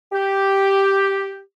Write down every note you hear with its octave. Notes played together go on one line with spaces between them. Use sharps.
G4